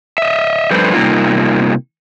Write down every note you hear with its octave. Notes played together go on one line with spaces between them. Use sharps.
D#5 E5
F3 G3 A3 D4 B4 C5
C3 G3 A#3 D#4 F4